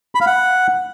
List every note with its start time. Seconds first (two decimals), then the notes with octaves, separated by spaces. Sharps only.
0.15 B5
0.21 F5
0.26 F#5